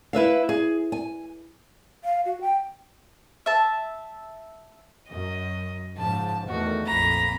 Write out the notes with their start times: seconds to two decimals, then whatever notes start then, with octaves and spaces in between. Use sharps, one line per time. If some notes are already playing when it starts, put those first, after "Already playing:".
0.13 E4 B4 E5 F5
0.49 G#4
0.92 G#5
2.04 F5
2.25 F#4
2.41 G5
3.46 E5 A5
5.09 F#2 D#5
5.98 G#2 C#3 F3 A5
6.47 E2 D#3 A3 F#4
6.86 A#1 F2 A#5 B5